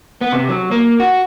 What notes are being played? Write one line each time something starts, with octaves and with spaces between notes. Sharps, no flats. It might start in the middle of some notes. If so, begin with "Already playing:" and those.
B3
C3
F#3
A#3
F#4